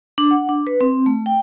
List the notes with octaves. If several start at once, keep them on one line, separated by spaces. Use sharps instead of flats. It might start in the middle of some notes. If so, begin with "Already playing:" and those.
D4
F#5
D4
B4
C4
A3
G5